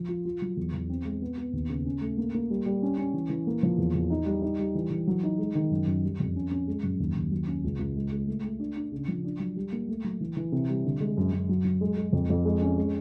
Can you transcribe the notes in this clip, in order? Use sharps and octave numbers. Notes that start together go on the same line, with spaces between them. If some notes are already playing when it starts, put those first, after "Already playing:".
Already playing: F3
F4
F4
F#3
E2
E2
C4
G#3
B3
B3
D#2
C#3
C#4
A3
A#3
A#3
G3
G3
C#4
C#4
E3
E3
A#3
F3
E2
E2
D#4
G3
D#4
G3
E3
E3
F#3
D#4
G#3
D#3
F#2
F#2
G3
F2
C#4
C#4
G#3
F#2
D#2
D#2
F#3
C#4
C#2
C#2
G#3
G#3
A3
A3
D4
D4
C#3
F3
D4
F#3
G3
A#3
A3
F#3
E3
E3
C3
G3
D3
G#3
F#2
F#2
F#3
F#3
G#3
G#3
F2
F2
G#3
C#4
G#3